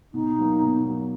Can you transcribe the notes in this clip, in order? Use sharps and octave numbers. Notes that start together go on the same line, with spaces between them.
B2 D#4
F#3 A#3
B2
F#3 A#3